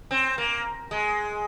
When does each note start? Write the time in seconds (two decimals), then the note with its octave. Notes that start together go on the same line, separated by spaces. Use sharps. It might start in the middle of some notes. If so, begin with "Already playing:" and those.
0.11 C4
0.38 A#3
0.91 G#3